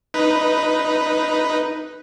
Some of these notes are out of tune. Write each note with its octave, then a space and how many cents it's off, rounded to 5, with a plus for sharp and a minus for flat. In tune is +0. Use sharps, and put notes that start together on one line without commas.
D#4 +0 B4 +0